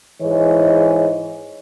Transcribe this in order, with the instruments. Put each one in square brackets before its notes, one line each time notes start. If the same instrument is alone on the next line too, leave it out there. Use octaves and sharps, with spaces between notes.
[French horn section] G#2 E3 G#4 C#5 D#5